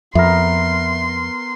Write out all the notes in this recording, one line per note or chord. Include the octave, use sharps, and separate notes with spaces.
F2 B3 A#4 E5 C6